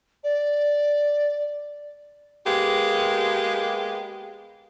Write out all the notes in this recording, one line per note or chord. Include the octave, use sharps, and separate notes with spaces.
D5
G#3 A#3 B3 G4